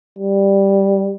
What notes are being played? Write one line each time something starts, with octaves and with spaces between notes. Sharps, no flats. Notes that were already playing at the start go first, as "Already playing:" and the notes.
G3